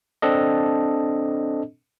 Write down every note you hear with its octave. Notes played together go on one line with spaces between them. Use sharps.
C4 D4 A4 D#5